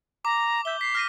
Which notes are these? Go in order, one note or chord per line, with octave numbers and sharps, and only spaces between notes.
A#5 D6
E5 G6 G7
B6 C7
F6 A#6 D#7